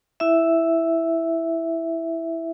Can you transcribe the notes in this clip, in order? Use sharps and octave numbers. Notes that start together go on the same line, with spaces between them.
E4 E5